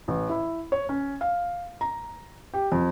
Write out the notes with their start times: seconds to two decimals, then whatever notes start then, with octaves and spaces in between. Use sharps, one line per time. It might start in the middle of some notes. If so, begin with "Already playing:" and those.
0.08 A1
0.29 E4
0.72 C#5
0.89 C#4
1.21 F5
1.81 A#5
2.54 G4
2.72 F2